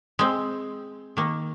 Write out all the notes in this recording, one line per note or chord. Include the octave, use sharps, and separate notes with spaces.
G#3 C4
D#3 A#3